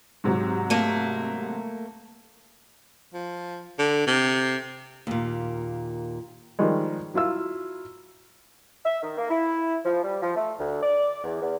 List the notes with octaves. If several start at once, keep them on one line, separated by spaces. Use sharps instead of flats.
G#2 C3 F#3
A3 A#3
F3
D3
C3
D#2 A#2
D#3 F3 G3 G#3
F#3 E4 F4 E6
E5
D#3
A#3
E4
F3
G3
F3
A3
D2
D5
E2
E2